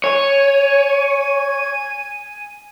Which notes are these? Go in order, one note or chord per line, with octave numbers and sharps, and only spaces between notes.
C#5 G#5